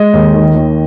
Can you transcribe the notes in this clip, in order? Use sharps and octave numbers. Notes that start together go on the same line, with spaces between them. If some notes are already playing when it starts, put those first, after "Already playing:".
Already playing: G#3 D#5
D#2
D#3
D#2